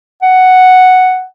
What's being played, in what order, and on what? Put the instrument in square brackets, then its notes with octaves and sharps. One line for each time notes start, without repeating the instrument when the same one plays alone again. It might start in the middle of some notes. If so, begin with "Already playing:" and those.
[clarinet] F#5